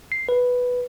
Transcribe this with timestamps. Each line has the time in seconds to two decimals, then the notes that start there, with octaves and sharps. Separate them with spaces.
0.12 C7
0.29 B4